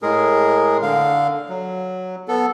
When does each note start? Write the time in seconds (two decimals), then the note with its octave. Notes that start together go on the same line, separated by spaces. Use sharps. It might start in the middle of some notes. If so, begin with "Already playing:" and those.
0.02 A2 G#3 G#4 A#4
0.82 D3 F5
1.49 F#3
2.28 B3 A4